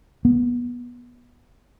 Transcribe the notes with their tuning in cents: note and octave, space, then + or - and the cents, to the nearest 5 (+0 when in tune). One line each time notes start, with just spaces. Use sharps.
B3 -20